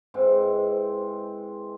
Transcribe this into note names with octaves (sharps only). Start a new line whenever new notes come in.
G#2 E3 C4